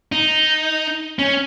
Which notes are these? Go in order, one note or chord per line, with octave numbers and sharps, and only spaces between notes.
D#4
C#4